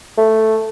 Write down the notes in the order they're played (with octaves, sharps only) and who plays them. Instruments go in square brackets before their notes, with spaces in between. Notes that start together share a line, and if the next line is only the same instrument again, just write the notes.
[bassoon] A3